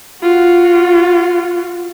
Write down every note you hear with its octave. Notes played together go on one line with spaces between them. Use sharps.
F4 F#4